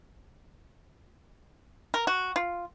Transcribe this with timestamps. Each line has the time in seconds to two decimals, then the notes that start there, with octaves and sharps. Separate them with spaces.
1.94 A#4
2.07 F#4
2.36 F4